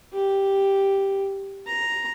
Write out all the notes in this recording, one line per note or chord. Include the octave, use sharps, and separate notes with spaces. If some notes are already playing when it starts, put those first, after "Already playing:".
G4
A#5